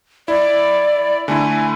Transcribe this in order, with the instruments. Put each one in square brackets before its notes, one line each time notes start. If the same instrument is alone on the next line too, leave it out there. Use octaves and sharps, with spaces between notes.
[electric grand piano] E4 [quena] D5
[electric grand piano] D3 A3 E4 [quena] G#5